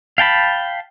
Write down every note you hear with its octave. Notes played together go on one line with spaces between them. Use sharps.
F5 G5 A5 B5